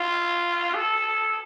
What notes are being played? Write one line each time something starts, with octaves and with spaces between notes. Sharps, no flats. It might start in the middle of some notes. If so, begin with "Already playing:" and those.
Already playing: F4
A4